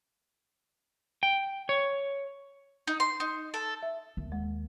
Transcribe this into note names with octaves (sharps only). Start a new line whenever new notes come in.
G5
C#5
D#4
C6
D#4
A4
E5
D#2
G#3